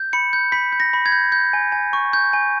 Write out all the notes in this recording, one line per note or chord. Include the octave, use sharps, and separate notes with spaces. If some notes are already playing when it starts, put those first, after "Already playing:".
Already playing: G6
B5 C#7
G6
B5 B6
G6
A#6
B5
G#6
G6
G6
G#5
G#5
C#6
G6
G#5